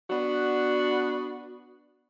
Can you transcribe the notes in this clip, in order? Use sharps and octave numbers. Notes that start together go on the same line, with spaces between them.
B3 D4 F#4